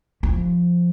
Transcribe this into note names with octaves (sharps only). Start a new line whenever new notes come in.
F3